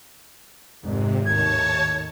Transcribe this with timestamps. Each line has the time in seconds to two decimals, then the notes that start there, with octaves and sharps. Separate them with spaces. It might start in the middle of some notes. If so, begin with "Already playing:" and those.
0.84 G#1 F2 C3 G#3
1.26 D#2 A2 D#3 C#5 A5 G#6